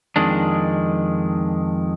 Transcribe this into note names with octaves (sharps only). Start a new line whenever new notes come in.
F2 D#3 G#3 D4